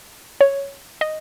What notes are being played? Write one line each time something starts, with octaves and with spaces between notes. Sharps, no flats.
C#5
D#5